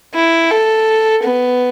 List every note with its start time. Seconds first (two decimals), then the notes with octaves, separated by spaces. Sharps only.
0.14 E4
0.50 A4
1.23 B3